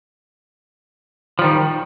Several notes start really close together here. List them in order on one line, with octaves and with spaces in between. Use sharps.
F3 G3 D#3